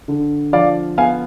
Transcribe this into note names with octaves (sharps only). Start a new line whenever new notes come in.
D3
F3 D5 F5
B3 F5 G#5